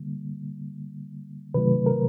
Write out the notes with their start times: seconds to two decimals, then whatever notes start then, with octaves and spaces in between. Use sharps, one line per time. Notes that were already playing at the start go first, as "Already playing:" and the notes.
Already playing: D3 G3 A#3
1.54 C3 D#3 F#3 A3 B4
1.86 A#4